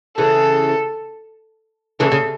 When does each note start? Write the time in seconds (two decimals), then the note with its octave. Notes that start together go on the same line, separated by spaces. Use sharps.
0.18 C#3 E3 A4
2.00 C#3 E3 A4
2.12 C#3